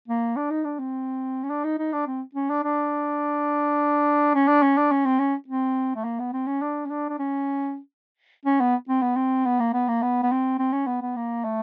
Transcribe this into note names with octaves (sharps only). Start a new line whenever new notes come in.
A#3
D4
D#4
D4
C4
C#4
D4
D#4
D#4
D4
C4
C#4
D4
D4
C#4
D4
C#4
D4
C#4
C4
C#4
C4
A3
A#3
B3
C4
C#4
D4
C#4
D4
D4
C#4
C#4
B3
C4
B3
C4
B3
A#3
B3
A#3
B3
B3
C4
C4
C#4
B3
B3
A#3
A3